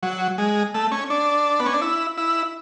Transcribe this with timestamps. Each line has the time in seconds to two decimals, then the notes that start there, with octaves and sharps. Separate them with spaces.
0.03 F#3
0.38 G#3
0.74 A3
0.92 C#4
1.10 D4
1.60 B3
1.66 C#4
1.73 D4
1.82 E4
2.17 E4